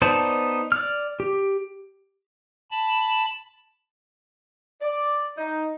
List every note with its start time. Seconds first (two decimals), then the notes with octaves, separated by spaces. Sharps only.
0.02 B3 D#4 C5 D5 A5
0.72 D5 F6
1.20 G4
2.71 A5 B5
4.81 D5
5.38 D#4